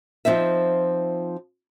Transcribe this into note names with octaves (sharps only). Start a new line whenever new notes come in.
F3 C4 D#4 E5